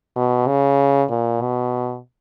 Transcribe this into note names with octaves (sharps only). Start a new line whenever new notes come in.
B2
C#3
A#2
B2